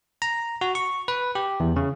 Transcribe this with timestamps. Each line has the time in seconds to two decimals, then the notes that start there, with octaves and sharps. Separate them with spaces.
0.22 A#5
0.61 F#4
0.75 C#6
1.08 B4
1.35 G4
1.60 E2
1.76 C#3